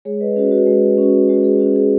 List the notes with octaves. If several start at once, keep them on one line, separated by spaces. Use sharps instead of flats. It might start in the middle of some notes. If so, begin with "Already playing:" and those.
G#3 G#4 C#5
B4 D#5
C#4 F#4 G#4
F#4 B4
G#3 G#4
C#4 F#4
G#3 F#4
G#4
C#4 F#4
G#4